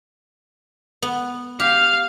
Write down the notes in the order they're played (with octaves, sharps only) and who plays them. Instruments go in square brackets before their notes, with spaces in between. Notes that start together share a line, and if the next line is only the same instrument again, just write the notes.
[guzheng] B3
[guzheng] G4 [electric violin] F5 F6